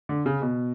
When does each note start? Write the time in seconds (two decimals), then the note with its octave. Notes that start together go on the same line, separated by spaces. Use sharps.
0.09 D3
0.26 C#3
0.42 B2